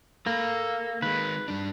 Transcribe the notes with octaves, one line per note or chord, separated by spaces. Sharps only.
A#3 A4 B5
D#3 G#3 B4
G2 D4